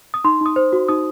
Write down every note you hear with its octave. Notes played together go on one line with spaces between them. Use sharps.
D#6
D#4 C6
D#4 D#6
C5
F#4
D#4 D#6